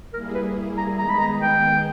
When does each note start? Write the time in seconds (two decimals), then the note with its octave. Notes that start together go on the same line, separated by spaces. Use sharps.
0.13 G3 A#3 E4 G#4 A#4
0.35 B4
0.78 A#5
0.98 D#3 G#3 B3 D#4 G#4 A#5
1.09 B5
1.19 A#5
1.42 G5